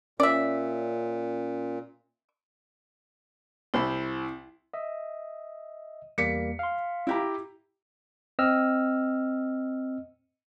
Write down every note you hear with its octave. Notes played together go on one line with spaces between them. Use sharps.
A#2 C#4 D5 E5
C2 E4 C5 B5
D#5 E5
E2 G3 A#3 B6 C#7
F5 C6
E4 G4 A#5
C4 D#5 E6 F6